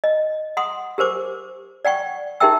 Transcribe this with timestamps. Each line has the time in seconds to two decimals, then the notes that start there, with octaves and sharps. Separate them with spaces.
0.04 D#5
0.57 F#5 C6 D#6
0.98 G4 A#4 C5 D6
1.85 D5 F#5 G5 C#6
2.40 D#4 G4 A#4 E5 G5 E6